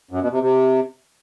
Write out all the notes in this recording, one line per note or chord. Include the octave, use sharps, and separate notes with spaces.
F#2
B2
C3
C3